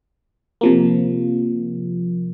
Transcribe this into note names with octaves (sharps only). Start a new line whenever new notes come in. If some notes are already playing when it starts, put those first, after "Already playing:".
C3 F3 A#3